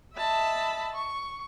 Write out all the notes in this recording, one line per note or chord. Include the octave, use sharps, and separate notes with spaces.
D#5 E5 A5 B5 E6
C#6